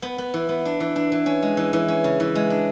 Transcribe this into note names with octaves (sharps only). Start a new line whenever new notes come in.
B3
B3
E3
B3
D4
E3
D4
E3
C#4
G#3
E3
E3
C#4
C#3
E3
G#3
D4